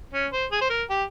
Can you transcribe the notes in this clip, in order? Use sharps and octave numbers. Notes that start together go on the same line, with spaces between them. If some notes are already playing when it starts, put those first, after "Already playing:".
C#4
C5
G#4
C5
A#4
G4